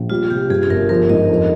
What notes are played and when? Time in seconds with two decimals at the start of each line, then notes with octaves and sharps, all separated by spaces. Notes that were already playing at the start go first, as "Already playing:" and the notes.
Already playing: A#1
0.10 G3 F4
0.30 C3 G4
0.49 G2 G#4
0.63 G#4
0.70 G1 A#4
0.89 F3 A#4
1.10 G#2 D#5
1.29 F2